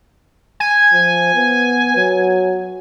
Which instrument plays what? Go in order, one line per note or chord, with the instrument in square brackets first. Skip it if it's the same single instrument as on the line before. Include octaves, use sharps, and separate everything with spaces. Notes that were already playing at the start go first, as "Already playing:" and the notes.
[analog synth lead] G#5
[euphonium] F3
B3
F#3